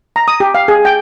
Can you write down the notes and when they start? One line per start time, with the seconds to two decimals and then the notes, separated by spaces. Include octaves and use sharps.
0.16 A#5
0.28 D#6
0.40 G4
0.55 F5
0.68 G#4
0.85 G5